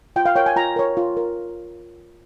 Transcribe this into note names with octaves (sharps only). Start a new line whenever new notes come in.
F4 G5
F5
A#4 C#5 G5
G#5
F4 A#5
A#4 C#5
F4
A#4